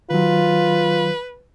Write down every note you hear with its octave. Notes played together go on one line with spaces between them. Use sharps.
D#3 F#3 F4 B4